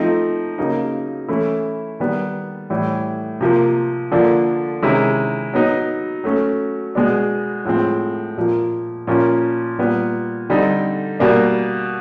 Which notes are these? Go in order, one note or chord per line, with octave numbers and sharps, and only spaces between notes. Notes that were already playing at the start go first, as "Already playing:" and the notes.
Already playing: F3 A3 C4 D#4
C#3 F#3 A#3 D#4
E3 A3 C#4 E4
D#3 G3 B3
A2 E3 G3
C3 F3 A#3
D3 F3 A#3 D4
C3 D#3 G#3 C#4 E4
F#3 B3 D#4
F#3 A3 C#4
B2 G#3 B3 D4
A2 F3 G#3 C4
A#2 F3 A#3
A#2 F3 A#3 C#4
A#2 G3 B3
D3 G3 C4 D#4
B2 G3 A#3 D4